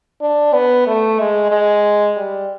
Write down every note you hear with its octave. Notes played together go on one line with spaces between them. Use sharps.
D4
B3
A3
G#3
G#3
G3